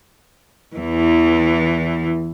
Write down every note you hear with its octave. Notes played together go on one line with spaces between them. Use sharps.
E2 E3